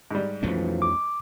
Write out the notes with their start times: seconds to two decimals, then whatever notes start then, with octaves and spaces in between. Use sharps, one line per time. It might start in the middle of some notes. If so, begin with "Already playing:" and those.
0.11 G#2 G3
0.43 B1 F2 E3 F3 A3 C#4
0.82 D6